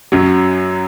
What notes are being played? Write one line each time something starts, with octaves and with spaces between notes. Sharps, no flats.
F#2 F#3